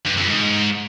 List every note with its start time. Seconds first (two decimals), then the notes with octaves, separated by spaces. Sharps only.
0.07 G2
0.18 F2
0.29 G#2